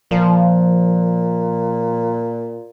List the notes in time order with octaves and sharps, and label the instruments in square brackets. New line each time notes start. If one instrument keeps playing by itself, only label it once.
[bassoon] A#2 [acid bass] F3